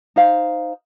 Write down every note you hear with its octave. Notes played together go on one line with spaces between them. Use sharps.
D#4 C5 F5